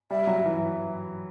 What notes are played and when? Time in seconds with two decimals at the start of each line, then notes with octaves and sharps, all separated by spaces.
0.10 G3 E5
0.27 F#3
0.46 E3